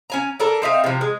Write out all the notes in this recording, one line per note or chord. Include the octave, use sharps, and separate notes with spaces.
C#4 G#5 A#5
D4 A4 A#4
C4 D#4 E5 F5
C3 F3
G#3